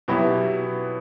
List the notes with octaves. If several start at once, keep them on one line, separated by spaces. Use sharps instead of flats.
B2 F#3 B3 E4 G4